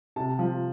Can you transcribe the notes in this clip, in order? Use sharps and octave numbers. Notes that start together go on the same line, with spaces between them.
C3 A5
F3